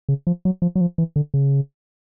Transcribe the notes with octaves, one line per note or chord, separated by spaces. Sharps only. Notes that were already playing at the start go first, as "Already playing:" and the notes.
C#3
F3
F#3
F3
F#3
F3
E3
D3
C#3